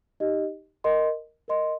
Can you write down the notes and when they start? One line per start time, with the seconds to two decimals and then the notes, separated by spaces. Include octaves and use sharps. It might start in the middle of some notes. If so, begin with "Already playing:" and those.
0.20 D#4 G4 D#5
0.84 A#4 D#5 C6
1.48 A#4 D#5 C6